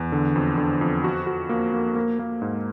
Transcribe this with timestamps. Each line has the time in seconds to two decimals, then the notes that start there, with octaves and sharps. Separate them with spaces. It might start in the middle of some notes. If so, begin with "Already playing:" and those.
Already playing: E2
0.12 D3
0.36 F2
0.58 D3
0.81 F2
1.04 F#4
1.27 F#4
1.49 A#3
1.73 A#3
1.95 A#3
2.19 A#3
2.42 G#2